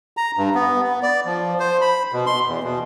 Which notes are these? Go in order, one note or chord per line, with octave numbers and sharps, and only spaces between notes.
A#5
G2
B3
B3
D5
F3
C5
B5
B2
C6
E2
B2